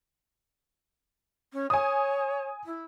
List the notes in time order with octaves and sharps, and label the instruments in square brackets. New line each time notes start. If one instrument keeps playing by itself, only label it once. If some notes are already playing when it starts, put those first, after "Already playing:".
[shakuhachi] C#4
[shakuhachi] C#5 [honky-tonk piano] G#5 D#6
[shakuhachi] E4